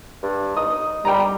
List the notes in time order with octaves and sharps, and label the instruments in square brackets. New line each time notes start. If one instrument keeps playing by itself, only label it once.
[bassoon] G2
[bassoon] D#4 [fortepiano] D#6
[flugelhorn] G3 [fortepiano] G5 A#5